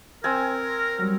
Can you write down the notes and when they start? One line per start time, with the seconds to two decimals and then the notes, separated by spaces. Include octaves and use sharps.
0.24 C4 A#4 G#5
0.98 F#3 G3